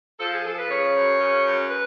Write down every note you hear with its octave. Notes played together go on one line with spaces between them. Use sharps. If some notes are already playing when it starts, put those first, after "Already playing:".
F3 A4
G#4
F3 A4
B4
C#3 C#5
F#2
C#3
F#2
B4